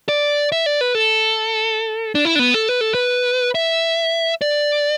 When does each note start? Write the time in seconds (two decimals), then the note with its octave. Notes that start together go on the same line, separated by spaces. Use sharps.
0.09 D5
0.52 E5
0.66 D5
0.81 B4
0.95 A4
2.15 D4
2.25 E4
2.35 D4
2.39 B3
2.54 A4
2.69 B4
2.81 A4
2.94 B4
3.55 E5
4.42 D5